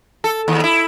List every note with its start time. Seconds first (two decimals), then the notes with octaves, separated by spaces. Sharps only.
0.24 A4
0.48 D#2
0.64 E4